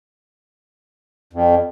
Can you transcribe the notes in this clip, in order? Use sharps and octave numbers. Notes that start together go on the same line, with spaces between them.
F2